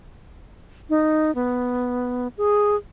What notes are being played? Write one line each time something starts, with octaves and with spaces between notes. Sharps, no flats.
D#4
B3
G#4